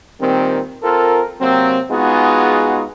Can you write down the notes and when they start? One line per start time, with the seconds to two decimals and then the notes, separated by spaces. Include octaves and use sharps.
0.21 A#2 D#3 G3 C4
0.84 C4 F4 A4 A#4
1.40 C3 F#3 A#3 C4
1.90 G#3 B3 D#4 F4 F#4 G#4